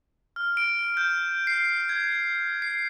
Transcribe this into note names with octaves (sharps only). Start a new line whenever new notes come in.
F6
D7
G6
C7
G#6
C7